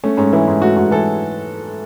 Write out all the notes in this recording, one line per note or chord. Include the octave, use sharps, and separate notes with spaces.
A3 C#4
G#2 C#4
E3 E4
G#2
A3 F#4
G#2 F#4
E3 A4